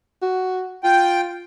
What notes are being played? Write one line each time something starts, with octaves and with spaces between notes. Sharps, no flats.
F#4
F4 G5